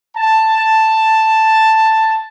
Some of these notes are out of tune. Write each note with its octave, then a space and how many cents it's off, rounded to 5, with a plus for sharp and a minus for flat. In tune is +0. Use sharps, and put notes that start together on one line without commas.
A5 +5